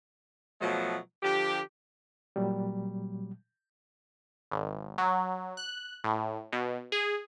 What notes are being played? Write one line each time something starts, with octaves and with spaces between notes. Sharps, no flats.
B2 F3 F#3 A3 B3
D3 F3 G4
A#2 F#3 G3
G#1
F#3
F#6
A2
B2
G#4